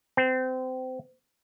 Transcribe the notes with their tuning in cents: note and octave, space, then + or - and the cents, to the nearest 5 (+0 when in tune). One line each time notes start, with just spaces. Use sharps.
C4 -25